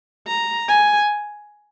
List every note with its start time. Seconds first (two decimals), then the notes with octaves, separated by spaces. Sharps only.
0.27 A#5
0.68 G#5